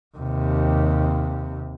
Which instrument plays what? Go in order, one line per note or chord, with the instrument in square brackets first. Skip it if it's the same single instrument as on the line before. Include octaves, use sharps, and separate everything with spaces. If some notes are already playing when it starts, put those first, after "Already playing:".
[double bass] D#2 C3